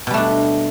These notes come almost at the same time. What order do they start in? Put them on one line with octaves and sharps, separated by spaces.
B2 G3 A3 D4